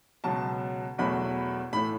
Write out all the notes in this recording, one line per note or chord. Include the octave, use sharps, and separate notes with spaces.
C#2 B2 F#3 A5
E2 B2 F#3 A3 B5
A2 E3 A3 B5